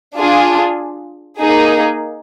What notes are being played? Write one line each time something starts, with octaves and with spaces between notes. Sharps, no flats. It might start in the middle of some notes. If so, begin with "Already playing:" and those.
D4 F4 G#4
A#3 D#4 G#4